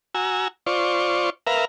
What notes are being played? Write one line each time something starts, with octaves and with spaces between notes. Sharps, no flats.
F#4 G#5 A#5 E6
F4 C5 D5 C#6
A#4 B4 E5 F5 A#5